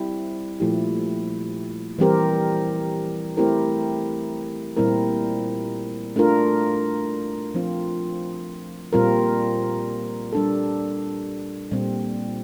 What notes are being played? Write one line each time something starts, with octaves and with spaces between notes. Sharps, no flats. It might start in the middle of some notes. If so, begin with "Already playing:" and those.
Already playing: G3 C4 E4
A#2 F3 A3 E4 G4
E3 G3 C4 G4 A#4
A3 C4 E4 G4 A#4
A#2 G3 C4 E4 A#4
A3 D4 F4 A#4
F3 C4 F4
A#2 G3 C4 F4 A#4
G3 D4 A4
A#2 G3 C4